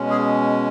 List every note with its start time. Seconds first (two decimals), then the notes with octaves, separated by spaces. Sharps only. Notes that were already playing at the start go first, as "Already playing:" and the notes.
Already playing: B2 G#3 C#4
0.10 G#4